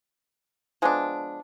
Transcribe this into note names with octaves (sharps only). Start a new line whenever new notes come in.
F3 G#3 B3 D4